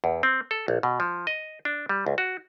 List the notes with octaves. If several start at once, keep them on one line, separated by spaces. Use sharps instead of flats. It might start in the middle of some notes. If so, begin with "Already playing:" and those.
E2
C4
A4
A#1
B2
F3
D#5
D4
G3
C#2
F#4